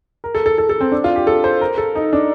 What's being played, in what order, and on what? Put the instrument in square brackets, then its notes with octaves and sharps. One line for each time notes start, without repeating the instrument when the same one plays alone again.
[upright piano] A#4
A4
A4
A4
A4
C4
D4
F4
G4
A4
C5
A#4
A4
D#4
D4